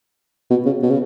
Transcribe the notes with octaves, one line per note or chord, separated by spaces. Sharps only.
B2
C#3
B2
C#3